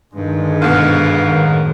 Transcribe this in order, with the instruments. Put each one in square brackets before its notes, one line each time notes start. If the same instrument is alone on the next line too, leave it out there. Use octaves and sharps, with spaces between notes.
[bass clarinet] G2 [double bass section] D3 D#3 G#3
[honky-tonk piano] G#2 B2 [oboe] F5
[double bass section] F#2 A2 D#3